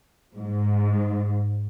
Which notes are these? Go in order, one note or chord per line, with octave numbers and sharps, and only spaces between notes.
G#2